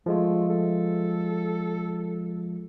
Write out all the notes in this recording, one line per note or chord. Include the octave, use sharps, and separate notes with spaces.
F3 G#3 A3 F4
A4